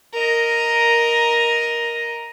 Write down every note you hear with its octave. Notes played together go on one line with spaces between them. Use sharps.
A#4 D#5